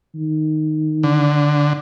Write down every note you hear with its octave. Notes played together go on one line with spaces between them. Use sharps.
D#3
D3